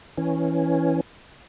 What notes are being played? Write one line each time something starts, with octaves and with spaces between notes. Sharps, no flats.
E3 C#4